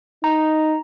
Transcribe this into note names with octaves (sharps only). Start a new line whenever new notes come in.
D#4 A#5